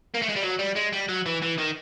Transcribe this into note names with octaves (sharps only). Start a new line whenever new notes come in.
A#3
A3
G#3
G3
F#3
G3
G#3
G3
F#3
E3
E3
D#3